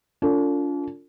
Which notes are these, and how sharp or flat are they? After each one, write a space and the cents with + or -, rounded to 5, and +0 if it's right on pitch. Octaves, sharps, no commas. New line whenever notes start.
D4 -45 F4 +0 A4 +35